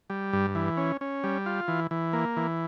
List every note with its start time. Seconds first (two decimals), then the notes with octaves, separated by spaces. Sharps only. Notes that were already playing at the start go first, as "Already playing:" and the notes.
0.10 G3
0.33 G2
0.55 E3
0.77 C#4
1.01 C#4
1.24 G3
1.46 F4
1.68 E3
1.91 E3
2.13 A#3
2.37 E3